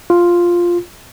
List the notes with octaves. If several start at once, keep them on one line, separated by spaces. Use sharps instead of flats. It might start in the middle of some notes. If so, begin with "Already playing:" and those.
F4